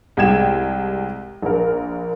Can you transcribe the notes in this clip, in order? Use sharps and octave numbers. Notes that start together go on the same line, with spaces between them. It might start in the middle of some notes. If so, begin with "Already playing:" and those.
C2 G#3 G5 G#6 E7
A#1 A#4